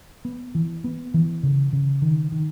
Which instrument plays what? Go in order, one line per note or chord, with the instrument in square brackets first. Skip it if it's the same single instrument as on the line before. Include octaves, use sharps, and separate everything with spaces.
[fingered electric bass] B3
E3
B3
E3
C#3
C#3
D#3
D#3